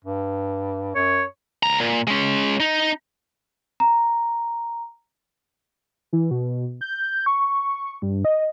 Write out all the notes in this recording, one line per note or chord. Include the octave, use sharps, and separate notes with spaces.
G2
F#2 C#5
C#2 A#5
A#2
G#3 C#4
D#4
A#5
E3
B2
G6
C#6
G2
D#5